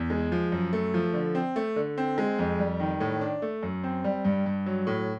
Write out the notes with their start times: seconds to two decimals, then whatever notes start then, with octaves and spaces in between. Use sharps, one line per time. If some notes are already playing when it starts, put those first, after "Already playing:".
Already playing: E2
0.10 G#3
0.32 F3
0.52 F#2
0.73 A3
0.94 F3
1.13 D3
1.35 C4
1.56 A3
1.76 D3
1.98 C4
2.18 G#3
2.39 F2
2.59 G3
2.80 D#3
3.00 A2
3.21 D4
3.42 A3
3.63 F#2
3.84 C4
4.04 G3
4.25 G2
4.46 G2
4.66 F#3
4.87 A2